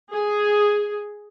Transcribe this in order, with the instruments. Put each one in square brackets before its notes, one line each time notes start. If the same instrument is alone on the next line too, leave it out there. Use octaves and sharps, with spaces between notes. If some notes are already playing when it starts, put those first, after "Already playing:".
[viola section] G#4